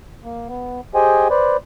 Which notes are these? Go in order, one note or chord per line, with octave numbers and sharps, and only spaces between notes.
A#3
B3
G4 G#4 C5 D#5 G5 G#5
B4 C5 D5